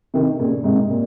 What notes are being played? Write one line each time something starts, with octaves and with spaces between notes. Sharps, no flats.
C3 D#3
A#2 C#3
G#2 C3
A#2